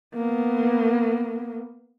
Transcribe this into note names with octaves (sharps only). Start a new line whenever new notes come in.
A#3 B3